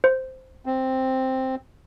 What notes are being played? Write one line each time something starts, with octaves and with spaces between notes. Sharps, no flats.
C5
C4